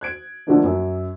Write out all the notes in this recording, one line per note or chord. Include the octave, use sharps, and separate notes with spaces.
F#6 G#6 D7
D3 F3 A3 A#3 D4 D#4
F#2